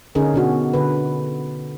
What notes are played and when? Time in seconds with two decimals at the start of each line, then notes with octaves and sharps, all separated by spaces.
0.15 D3 C#4 D#4 G#4 A#4
0.34 B2 D4 F#4
0.74 D3 B4